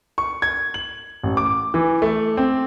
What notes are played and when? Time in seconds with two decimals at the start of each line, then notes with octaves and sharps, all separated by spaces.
0.18 C#6
0.42 G#6
0.74 F#7
1.23 A1
1.37 D6
1.74 E3
2.02 A3
2.37 C4